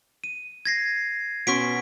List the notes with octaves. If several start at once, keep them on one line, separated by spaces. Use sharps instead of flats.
D#7
G#6 A#6 C7
B2 C#4 C6 C#6 B6 D7